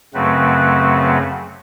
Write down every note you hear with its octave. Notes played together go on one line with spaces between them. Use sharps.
F#2 C#3 F#3 A3 C4 B4